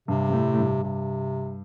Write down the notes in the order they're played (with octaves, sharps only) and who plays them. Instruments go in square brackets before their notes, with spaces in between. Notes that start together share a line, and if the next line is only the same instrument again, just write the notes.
[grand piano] G2 [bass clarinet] C3
[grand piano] G2
A2
A2
G2
[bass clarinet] C3